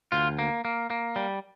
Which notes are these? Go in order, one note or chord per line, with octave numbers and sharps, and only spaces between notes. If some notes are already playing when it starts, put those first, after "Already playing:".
D2 F4
A#3
A#3
A#3
G3